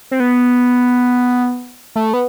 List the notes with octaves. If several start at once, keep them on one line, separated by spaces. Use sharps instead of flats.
C4
B3
A3
B3